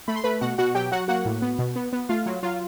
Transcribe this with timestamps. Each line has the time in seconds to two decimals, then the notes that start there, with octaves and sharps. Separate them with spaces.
0.08 A3 B5
0.16 C6
0.24 A3 B4 B5
0.41 B2 F#4 F#5
0.58 B2 F#4 F#5
0.75 F#3 G4 G5
0.92 F#3 F#4 F#5
1.08 A#3 F#4 F#5
1.25 A2
1.42 B3
1.59 B2
1.76 B3
1.93 B3
2.09 A3 F4 F5
2.26 F#3
2.43 F#3 F4 F5